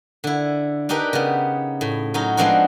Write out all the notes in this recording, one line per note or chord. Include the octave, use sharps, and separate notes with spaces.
D3 E4
D4 D#4 G4 A#4 B4
C#3 B3
A2
F#3 C#4 D#4
F3 G#3 B3 C4 D4 F#4